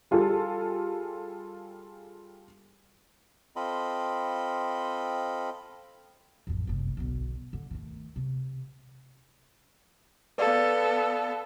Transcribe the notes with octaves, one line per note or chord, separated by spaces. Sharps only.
G3 F4 G#4 A4
C4 F4 A4 D#5 B5
A1 F2
F#1 C2
B1 D3
D3
D#3 A3
C3
B3 A4 B4 D5 F5